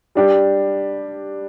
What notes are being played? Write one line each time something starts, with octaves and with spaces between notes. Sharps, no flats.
G3 D4 G4